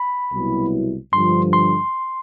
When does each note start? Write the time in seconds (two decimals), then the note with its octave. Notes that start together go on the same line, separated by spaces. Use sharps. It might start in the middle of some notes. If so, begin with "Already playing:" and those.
Already playing: B5
0.33 C2 B2 F#3 B3 E4
1.13 G2 D3 F3 C6
1.53 C6